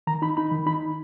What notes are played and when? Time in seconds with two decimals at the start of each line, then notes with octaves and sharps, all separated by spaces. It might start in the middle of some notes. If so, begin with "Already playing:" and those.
0.07 D#3 A#5
0.22 D#4 B5
0.37 D#4 B5
0.51 D#3
0.66 D#4 B5